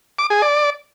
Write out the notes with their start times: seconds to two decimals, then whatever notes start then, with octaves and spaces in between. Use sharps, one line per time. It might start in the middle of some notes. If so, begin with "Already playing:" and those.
0.19 D6
0.30 G#4
0.42 D5